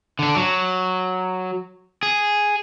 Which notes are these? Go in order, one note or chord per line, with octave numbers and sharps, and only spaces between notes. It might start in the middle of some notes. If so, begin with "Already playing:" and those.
D3 D4
F#3
G#4